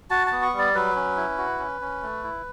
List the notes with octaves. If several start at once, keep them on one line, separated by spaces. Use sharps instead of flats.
F#4 A5
A5
B3
C#6
G3
D5
F#3 B4
C#4
E4
F#4
C#4
C#4
A3
E4